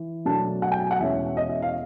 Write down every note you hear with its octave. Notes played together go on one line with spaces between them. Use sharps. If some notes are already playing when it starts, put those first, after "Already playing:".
Already playing: E3
B2 F#3 A3 D4 A5
F#5
G5
G#5
F#5
E2 B2 G#3 C#4 E5
D#5
E5
F5